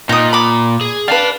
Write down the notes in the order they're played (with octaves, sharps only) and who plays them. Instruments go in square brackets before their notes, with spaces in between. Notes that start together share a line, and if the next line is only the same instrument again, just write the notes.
[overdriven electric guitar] A#2 [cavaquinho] D#4 D#6
[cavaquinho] B5 D6
[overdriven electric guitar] G#4
[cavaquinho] B4 F5 [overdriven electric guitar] D5 A5